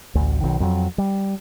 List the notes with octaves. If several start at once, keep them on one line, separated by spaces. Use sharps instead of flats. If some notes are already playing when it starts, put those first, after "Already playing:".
A1 D2
B1 D#3
F2 F3 F#3
G3